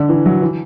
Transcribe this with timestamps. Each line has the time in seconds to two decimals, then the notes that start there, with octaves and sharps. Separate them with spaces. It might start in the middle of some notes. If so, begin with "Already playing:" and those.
Already playing: D3
0.09 E3
0.26 F#3
0.41 E3